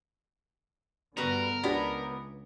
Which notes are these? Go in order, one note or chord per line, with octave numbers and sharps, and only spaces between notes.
G2 D3 G3 B3 F#4 A#4 B4
C#2 B3 D4 G4 C#5 A#5